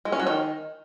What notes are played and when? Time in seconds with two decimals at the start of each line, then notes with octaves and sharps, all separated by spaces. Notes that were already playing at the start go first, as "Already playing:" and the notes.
0.05 G#3
0.12 C#4
0.20 F#3
0.27 D#3